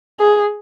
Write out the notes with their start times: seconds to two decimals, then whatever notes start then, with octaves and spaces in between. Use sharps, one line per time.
0.20 G#4